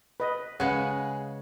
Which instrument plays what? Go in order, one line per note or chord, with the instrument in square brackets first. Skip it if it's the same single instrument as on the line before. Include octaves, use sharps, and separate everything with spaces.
[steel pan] B4 D#5
[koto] C#3 G#3 [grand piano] G#4 B4 F5 [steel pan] F#5